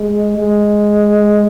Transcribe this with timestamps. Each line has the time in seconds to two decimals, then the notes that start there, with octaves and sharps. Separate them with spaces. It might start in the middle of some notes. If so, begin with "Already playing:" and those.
Already playing: G#3
0.37 G#3